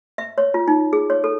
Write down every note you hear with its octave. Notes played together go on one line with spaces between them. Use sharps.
E5
C#5
F4
D#4
G#4
C#5
A4